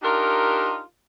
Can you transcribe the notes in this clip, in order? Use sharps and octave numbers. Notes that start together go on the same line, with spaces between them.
D4 D#4 F4 G4 A#4